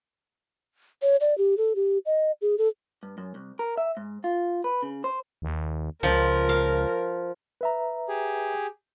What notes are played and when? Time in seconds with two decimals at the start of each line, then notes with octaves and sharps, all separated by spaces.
1.02 C#5
1.21 D5
1.38 G4
1.57 A4
1.76 G4
2.06 D#5
2.42 G#4
2.58 A4
3.03 G2
3.18 F#2
3.35 C2
3.59 A#4
3.77 E5
3.97 G#2
4.24 F4
4.64 B4
4.83 C#3
5.04 C5
5.42 D#2
6.03 C#2 F3 A#4
6.49 F5
7.61 B4 E5 A#5
8.09 G4 G#4